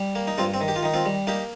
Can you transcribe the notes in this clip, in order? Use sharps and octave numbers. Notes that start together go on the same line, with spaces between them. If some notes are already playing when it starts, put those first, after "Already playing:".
Already playing: G3
A#3
D#4
G2 C4 F4
C4
D#3
G4
F4
D#3 D#4
C4 F4
G3
A#3 D#4 G4